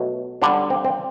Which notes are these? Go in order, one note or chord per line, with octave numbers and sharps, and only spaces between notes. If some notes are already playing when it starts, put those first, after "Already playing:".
Already playing: B2 F#3 A3
D3 G3 D4
C4
C4